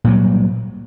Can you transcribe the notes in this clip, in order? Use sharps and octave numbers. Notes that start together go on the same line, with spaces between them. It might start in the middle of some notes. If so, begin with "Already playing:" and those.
A#2 F#3 G3